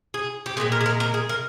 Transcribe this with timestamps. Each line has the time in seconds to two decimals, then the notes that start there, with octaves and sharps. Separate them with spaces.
0.14 G#4
0.46 G4
0.57 A#2 F3 G#3 G#4
0.72 A#4
0.81 G#4
0.86 A#4
1.00 A#4
1.14 G#4
1.29 A#4